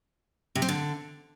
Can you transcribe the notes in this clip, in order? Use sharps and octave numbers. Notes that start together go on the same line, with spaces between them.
C3
C4
D3